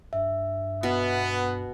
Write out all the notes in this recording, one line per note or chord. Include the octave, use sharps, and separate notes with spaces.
G2 E5
B2 B3